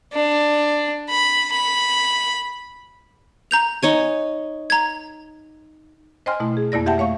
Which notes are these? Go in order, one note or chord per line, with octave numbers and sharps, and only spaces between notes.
D4
B5
B5
A#5 G6 F7
D#4 C#5 G#5
A#5 G#6
C5 D#5 G5 G#5 C6 F6
B2 A3 E4
G#4
F2 A#3 E4 D5 A#6
G4 E5 F#5 G5 A5
A3 C#5 F5 C#6